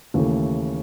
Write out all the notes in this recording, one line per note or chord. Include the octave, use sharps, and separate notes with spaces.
D#2 C#3 E3 A3